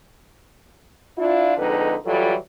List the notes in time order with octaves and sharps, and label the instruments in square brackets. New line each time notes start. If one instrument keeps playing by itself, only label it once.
[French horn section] D4 E4 F4
F2 D3 G#3 D#4 B4
E3 F#3 G3 F4 A4